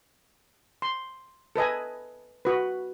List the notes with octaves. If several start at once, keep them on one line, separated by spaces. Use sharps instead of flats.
C6
A4 B4 D#5 G#5
F#4 B4